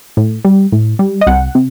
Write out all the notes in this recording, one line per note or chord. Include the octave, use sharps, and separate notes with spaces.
A2
G3
A2
G3
D#5
C2 F#5
C3